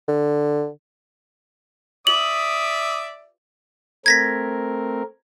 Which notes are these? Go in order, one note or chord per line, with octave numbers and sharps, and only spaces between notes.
D3
D5 E5 D#6 F#7
A3 C4 A#4 G#6 A#6 B6